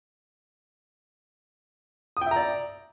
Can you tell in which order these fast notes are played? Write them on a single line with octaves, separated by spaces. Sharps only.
D#6 G5 E5 A#5 D5